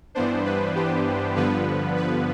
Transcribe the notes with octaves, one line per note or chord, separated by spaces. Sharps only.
G2 E3 B3 D4 C5
B4
G4
G2 D3 F3 B3 B4
B4